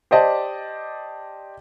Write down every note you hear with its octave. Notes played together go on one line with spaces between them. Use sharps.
G4 C5 D5 D#5 A5